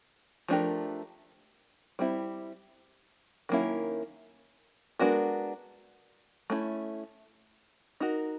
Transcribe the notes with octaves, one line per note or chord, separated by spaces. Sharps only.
F3 A3 D4 G4 A#4
G3 C4 E4
D#3 F#3 A#3 C#4 E4
G#3 B3 D4 F#4 A#4
A3 C#4 E4
D#4 F#4 A#4